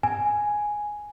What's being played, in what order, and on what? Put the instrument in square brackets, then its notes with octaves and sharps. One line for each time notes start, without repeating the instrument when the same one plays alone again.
[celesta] G#5